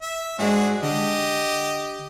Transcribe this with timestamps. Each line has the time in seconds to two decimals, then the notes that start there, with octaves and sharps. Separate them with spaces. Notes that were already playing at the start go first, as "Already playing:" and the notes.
0.02 E5
0.39 G#2 G#3 D4 F#4 G#4
0.83 D3 G4 D#5